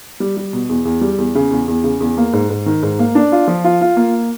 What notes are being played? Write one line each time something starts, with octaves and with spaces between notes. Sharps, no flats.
G3
G3
B2
E2
E2
G3
E2
C#3
E2
E2
C#3
E2
A#3
G#2
G#2
D#3
G#2
A#3
D4
F4
F3
F4
F4
A#3